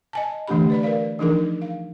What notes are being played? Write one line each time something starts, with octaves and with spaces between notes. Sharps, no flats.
D#5 G#5 A5
D3 E3 A3 D4 G4 B5
B4 D5 B5
A#4 B4 D5 F5
E3 F3 D4 D#4 G#4 A#4
F5